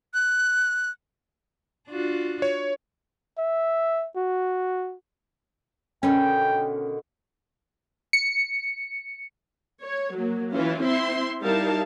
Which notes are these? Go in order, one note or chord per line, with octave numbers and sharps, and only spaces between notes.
F#6
D4 F4 F#4
C#5
E5
F#4
B2 D3 D#3 C#4 G5
C#7
C#5
F#3 A#3
E3 C#4 E4 F4
C4 E4 E5 C6
G3 D#4 E4 A#4 F5 A5